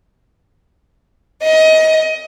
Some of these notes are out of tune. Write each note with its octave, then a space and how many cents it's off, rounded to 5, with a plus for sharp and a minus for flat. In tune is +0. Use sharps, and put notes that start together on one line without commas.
D#5 +25